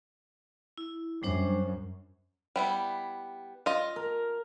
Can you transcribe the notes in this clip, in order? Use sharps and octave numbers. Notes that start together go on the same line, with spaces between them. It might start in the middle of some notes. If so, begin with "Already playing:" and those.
E4
F#2 G3 D4 C5
G3 B3 E4
F4 D#5
A#4